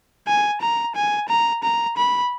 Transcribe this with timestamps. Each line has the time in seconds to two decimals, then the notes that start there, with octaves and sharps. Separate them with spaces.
0.27 G#5
0.61 A#5
0.95 G#5
1.29 A#5
1.63 A#5
1.97 B5